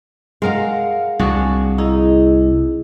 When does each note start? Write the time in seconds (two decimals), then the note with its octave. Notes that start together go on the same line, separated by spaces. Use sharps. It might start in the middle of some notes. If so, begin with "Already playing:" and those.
0.42 G#3 A#4 F5 F#5
1.19 C2 D4 F#4 G#4
1.78 D#4 E4 G#4 D#5